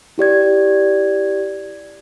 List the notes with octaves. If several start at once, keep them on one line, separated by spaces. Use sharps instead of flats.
E4 G4 D5 G#6